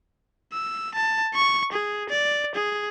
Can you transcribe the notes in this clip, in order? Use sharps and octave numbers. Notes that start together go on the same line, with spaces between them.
E6
A5
C#6
G#4
D5
G#4